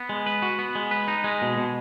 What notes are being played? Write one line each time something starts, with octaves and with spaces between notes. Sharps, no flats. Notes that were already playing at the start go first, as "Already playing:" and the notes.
Already playing: B3
G#3
B4
F#4
B3
G#3
B4
D#4
G#3
B2
B2